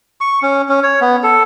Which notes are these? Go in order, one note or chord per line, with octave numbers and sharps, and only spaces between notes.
C#6
C#4
C#4
C#5
B3
A4